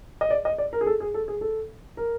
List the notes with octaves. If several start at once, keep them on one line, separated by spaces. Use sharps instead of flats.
D#5
D5
D#5
D5
A#4
G#4
A4
G#4
A4
G#4
A4
A#4